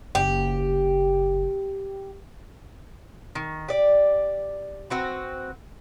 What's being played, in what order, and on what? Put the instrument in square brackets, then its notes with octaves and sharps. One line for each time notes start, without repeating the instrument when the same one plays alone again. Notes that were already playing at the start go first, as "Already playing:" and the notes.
[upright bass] F#1 [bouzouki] G4
[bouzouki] D#3
G4 D5
C4 F#4 B4